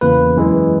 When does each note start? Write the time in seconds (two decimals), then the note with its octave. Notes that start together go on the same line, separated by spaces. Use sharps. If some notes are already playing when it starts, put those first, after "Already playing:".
0.01 E2 C#3 E3 A#3 B4
0.36 F#2 E3 G#3